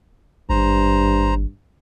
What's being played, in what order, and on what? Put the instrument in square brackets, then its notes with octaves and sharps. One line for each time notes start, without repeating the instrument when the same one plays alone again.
[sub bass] G#1 [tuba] G2 [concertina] C5 A#5